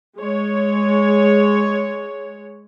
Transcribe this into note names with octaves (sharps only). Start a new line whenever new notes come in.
G#3 C#5